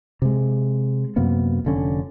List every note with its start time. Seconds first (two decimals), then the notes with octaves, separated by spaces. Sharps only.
0.22 C3 G#3
1.16 F#2 C3 A#3 B3
1.65 F1 D3 C#4